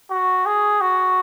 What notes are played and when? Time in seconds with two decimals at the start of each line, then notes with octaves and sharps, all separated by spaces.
0.11 F#4
0.46 G#4
0.81 F#4